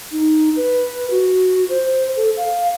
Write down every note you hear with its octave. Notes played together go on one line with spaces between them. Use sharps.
D#4
B4
F#4
C5
A4
F5